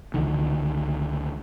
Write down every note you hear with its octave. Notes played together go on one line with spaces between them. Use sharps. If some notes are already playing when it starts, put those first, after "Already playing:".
C#2 D3 D#3